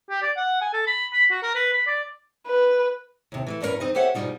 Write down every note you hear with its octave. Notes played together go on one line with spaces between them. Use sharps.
G4
D5
F#5
G#5
A4
B5
B5
F#4
A#4
B4
B5
D5
B4
D#2 C3
E3 G#3 A3
E2 G2 C#4 D4 A#4 B4
F2 C4 D#4 D#5
G4 A4 C5 C#5 E5 F#5
G#2 B2 F3 G3 D#4 F4